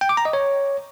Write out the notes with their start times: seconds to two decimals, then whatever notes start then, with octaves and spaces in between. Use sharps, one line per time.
0.01 G5
0.09 D6
0.17 A#5
0.25 D#5
0.33 C#5